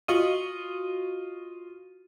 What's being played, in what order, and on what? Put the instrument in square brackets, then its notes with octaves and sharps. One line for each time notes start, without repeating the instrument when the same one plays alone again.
[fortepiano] F4 D#5 [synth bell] F#4 C#6 D#7